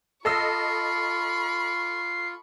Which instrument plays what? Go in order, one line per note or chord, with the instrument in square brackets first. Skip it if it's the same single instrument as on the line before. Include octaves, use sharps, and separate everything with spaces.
[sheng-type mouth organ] F4 [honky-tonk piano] A4 D#5 E6 [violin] B5 C#6 [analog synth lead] C7